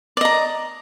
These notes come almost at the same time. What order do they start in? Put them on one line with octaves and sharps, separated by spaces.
D5 D#5 A#5